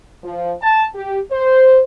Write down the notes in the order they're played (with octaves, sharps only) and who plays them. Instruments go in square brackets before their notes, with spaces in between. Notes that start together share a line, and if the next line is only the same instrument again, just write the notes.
[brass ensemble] F3
A5
G4
C5